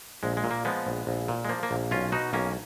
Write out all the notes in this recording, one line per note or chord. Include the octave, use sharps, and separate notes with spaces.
A#1 G#3
G#3
A#2
A#3
F3 G#3 B3
A#1
A#1
A#2
G#3
F3 A#3
A#3
A#1
B1 C#4 F4
B2 D#4 F#4
B1 A#3 C#4